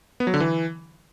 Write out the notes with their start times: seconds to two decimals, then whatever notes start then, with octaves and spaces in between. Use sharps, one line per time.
0.20 B3
0.27 F#3
0.34 D3
0.40 E3